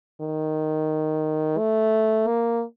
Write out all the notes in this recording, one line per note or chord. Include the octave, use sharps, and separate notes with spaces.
D#3
A3
A#3